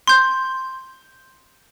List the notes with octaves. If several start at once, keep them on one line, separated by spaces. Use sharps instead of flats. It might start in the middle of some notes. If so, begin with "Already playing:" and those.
C6 G6